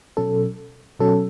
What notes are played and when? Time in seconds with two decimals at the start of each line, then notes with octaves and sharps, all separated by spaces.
0.17 B2 F#3 C#4 A4
0.99 B2 F#3 C#4 A4